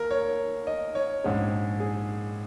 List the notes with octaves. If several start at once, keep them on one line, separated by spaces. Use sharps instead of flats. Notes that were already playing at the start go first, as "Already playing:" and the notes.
Already playing: D#2 A#4
C#5
D#5
C#5
A#1 G#2 G#3 C#4
G#4